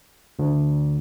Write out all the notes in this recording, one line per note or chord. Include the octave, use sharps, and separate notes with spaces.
D2